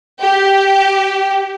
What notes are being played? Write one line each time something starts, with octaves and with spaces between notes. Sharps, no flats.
G4